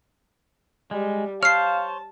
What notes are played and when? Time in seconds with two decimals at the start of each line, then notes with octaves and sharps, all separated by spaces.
0.91 G3 G#3
1.43 C5 C#5 F5 A5 F6 C7